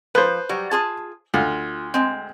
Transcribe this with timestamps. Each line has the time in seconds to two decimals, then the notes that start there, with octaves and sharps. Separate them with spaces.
0.15 F3 B4 C5
0.49 F#3 G3
0.71 F4 G#4 A5
1.34 D2 F4
1.94 G#3 C4